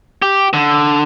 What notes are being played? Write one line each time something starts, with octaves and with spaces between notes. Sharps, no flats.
G4
D3